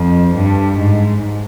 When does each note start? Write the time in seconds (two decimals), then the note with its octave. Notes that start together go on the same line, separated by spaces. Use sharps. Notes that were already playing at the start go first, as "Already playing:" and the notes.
Already playing: F2
0.35 G2
0.79 G#2